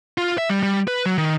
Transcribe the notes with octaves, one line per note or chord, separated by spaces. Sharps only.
F4
E5
G3
G3
B4
F#3
D#3